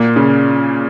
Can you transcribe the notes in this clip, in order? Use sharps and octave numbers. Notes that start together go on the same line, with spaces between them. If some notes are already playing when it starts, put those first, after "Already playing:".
Already playing: A#2 A#3
C#3